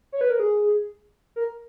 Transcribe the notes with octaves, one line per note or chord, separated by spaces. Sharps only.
C#5
B4
A#4
G#4
A#4